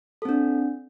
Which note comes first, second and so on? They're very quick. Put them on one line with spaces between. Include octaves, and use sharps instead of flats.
A4 C4 D4